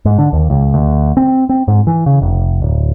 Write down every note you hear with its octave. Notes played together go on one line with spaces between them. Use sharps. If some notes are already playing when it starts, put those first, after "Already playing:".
G#2
D3
D#2
C#2
D2
C4
C4
G#2
E3
C#3
F1
D1